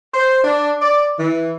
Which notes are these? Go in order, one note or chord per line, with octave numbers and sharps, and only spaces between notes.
C5
D4
D5
E3